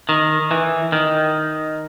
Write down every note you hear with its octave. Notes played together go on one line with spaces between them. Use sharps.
D#3
E3
D#3